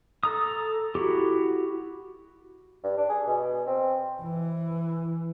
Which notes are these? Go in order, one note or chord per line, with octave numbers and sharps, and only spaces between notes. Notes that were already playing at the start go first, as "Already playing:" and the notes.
A4 A#5 D#6
E4 F#4 G4
G2
D4
G#4
B2
C4
E3